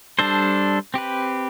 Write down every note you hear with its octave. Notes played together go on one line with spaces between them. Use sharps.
G3 D4 A4 C5
C4 G4 B4